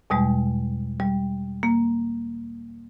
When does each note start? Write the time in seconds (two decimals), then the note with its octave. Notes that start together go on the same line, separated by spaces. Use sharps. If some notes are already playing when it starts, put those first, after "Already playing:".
0.10 E2 B2 G3 G#3
1.00 G3
1.63 A#3